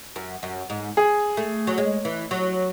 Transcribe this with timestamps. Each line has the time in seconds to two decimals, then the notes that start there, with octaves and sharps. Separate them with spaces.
0.16 F#2
0.43 F#2
0.70 G#2
0.97 G#4
1.37 A3
1.67 F#3
1.78 G#3
2.05 E3
2.31 F#3